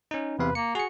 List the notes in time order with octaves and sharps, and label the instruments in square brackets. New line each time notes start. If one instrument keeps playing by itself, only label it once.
[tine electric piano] C#4 D#4
[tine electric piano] E2 C3 F5 [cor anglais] B4
[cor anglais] A#3 [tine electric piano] C#7
[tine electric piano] F#4 C#7 [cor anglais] G#4